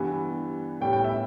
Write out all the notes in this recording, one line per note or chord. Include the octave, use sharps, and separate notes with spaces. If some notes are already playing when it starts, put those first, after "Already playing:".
Already playing: G2 E3 G3 B3
A2 G3 B3 G5
G5
E5